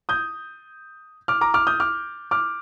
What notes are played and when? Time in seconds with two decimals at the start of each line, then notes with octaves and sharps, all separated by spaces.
0.09 D#6 G6
1.28 D6 F6
1.41 A#5 D6
1.54 D6 F6
1.67 D#6 G6
1.80 D6 F6
2.31 D6 F6